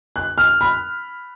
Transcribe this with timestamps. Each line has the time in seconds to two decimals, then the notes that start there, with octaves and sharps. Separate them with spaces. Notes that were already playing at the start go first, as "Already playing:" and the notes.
0.16 F#6
0.38 F6
0.61 B5